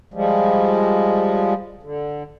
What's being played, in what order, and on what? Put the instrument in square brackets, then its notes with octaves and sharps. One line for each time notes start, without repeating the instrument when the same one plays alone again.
[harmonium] F3 G3 G#3
D3